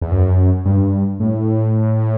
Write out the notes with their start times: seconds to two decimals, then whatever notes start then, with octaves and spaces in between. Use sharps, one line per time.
0.01 E2
0.11 F#2
0.65 G2
1.20 A2